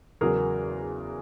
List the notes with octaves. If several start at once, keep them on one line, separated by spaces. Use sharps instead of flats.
E2 C#3 F#3 G#4 A#4